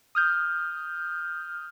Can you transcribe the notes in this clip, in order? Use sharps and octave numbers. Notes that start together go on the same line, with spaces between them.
D#6 F6 G6